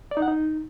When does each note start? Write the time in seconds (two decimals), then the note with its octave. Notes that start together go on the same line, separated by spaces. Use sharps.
0.11 D5
0.17 D#4
0.22 F#5
0.28 D#4